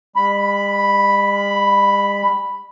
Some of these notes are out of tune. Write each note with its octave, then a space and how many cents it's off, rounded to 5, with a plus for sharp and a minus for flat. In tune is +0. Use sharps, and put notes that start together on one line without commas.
G3 +45 B5 +0